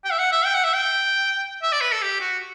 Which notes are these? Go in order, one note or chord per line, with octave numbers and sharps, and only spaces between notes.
G5
E5
F#5
E5
G5
F#5
E5
G5
E5
D5
B4
A4
G4
F#4